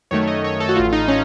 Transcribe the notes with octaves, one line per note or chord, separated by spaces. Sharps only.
F#2 D#3 A3 C#5
D#5
C#5
A4
F#4
A1 A2 A3 F4
D#4
C#4